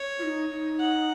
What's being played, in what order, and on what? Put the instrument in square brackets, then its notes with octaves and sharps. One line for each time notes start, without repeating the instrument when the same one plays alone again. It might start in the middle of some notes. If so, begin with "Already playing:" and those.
Already playing: [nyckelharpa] C#5
[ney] F4
D#4
D#4
[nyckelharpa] F#5